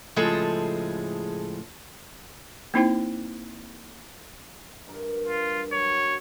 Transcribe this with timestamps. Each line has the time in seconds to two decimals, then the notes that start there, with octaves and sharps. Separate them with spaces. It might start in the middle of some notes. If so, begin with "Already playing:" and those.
0.16 A2 C#3 F3 G#3 G#4 A4
2.74 A#3 C4 D#4 E4 C5 G5
4.87 G2 A#4
5.28 F4
5.72 F#3 C#5